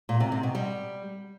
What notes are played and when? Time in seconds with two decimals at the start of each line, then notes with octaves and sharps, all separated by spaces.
0.09 A#2
0.20 C3
0.32 C3
0.43 B2
0.55 G3